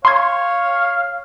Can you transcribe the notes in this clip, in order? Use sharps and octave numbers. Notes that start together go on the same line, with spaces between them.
C#5 F5 C6 G#6